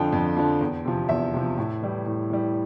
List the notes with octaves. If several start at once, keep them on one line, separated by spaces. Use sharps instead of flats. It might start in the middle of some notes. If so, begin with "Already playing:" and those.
Already playing: F2 D3 F3 G5
F2
D3 F3
E2
C3 F3
E2 E5
C3 F3
A2
E3 G3
A2
E3 G3